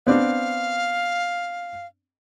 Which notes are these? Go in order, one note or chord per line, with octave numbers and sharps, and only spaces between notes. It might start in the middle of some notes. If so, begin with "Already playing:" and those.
B3 C4 D4 F5